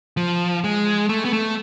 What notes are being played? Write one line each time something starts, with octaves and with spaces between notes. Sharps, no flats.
F3
G#3
A3
B3
A3